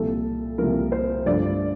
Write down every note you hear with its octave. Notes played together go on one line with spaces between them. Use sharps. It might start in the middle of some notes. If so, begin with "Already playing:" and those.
Already playing: C2 A#2 F3 A4
C2 A#2 F3 A#4
C5
G2 D3 F3 A3 D5